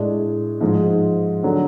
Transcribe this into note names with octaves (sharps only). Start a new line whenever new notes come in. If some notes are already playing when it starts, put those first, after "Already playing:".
Already playing: A2 G#3 D4
G#2 F3 G#3
D3 F#3 A3